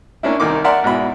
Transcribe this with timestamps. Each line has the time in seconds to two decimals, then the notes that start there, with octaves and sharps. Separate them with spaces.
0.23 A#3 C#4 D4 E4
0.40 C2 D#3 A#3 D#4 D6
0.64 A#4 D5 E5 F#5 A#5 C6
0.84 G#2 B2 E4 B5